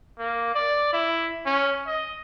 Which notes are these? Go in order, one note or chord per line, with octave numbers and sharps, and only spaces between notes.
A#3
D5
E4
C#4
D#5